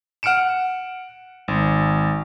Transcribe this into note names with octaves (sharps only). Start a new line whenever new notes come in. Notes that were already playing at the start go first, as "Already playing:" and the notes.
F#5 F6 C#7 D7 E7
G#1